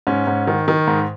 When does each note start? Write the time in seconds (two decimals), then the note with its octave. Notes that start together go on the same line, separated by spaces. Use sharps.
0.07 G#2 C#4
0.27 G#2
0.47 D#3
0.68 D#3
0.87 G#2